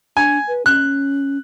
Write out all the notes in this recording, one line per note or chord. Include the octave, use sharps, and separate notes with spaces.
D4 G#5
B4
C#4 F#6